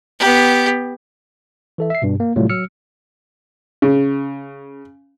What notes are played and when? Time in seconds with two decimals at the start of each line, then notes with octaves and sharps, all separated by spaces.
0.20 B3 G4
1.78 E3 A4 E5
1.90 E5 C7
2.02 G2 B2
2.20 A#3
2.36 A2 C3 F#3 G3 A3 F4
2.49 F#3 E6 F6 C#7
3.82 C#3